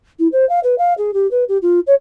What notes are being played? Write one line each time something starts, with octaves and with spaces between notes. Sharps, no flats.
E4
C5
F5
B4
F5
G#4
G4
B4
G4
F4
C#5